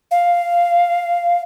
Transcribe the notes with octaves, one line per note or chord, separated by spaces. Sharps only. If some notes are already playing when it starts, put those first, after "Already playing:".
F5